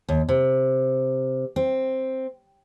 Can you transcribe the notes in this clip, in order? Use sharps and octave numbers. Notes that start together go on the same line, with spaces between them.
D#2
C3
C4